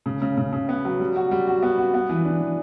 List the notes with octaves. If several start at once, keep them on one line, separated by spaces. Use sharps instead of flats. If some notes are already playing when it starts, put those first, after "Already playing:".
C#3
C#3
C#3
C#3
B3
F#3
G3
F#4
G3
F#4
B3
F#4
B3
E3
D4
E3